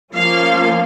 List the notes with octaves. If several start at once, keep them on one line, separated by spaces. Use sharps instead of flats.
F3 A#3 C#4 F5